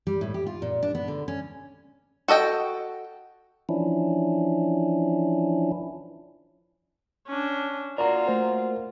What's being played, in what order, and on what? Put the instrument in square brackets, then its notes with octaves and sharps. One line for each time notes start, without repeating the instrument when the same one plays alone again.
[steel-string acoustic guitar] G3
A2
G4
F4
A#2
D4
B3
D3
C#4
[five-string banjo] F#4 A4 D#5 G5
[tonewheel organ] E3 F3 C#4 D4 E4
[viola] C#4 D4
[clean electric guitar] A#3 F#4 A#4 [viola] F4 [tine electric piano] D5 A#5
[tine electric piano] A3 C5